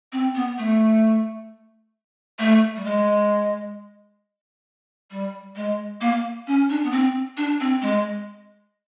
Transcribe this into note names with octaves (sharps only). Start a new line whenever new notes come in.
C4
B3
A3
A3
G3
G#3
G3
G#3
A#3
C#4
D4
B3
C4
D4
C4
G#3